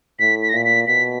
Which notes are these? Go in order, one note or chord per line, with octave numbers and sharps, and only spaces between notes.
A2 B6
B6
A#6
A#2 B6
B6
B2 B6